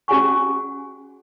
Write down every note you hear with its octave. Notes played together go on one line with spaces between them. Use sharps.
C#4 F#4 G#4 F#5 G#5 C#6